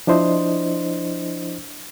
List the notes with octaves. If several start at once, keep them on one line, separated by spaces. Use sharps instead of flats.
F3 D4 E4 C5 D#5